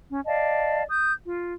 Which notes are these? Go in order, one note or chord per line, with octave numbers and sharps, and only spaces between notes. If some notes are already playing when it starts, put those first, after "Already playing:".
C#4
D5 D#5 F5 A5
D#6 G6
F4